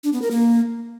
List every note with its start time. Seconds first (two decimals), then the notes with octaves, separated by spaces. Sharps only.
0.04 D4
0.13 B3
0.22 A#4
0.31 A#3